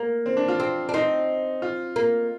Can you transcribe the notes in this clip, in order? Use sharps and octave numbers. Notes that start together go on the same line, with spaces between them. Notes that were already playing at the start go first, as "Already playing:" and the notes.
Already playing: A#3
C4
D4
F4
C4
D4
C4 D#4
F4
A#3